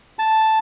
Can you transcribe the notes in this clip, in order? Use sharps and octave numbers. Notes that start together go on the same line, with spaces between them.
A5